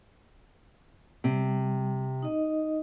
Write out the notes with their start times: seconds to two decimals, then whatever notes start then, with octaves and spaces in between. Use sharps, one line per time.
1.24 C3 G3
2.23 D#4 D#5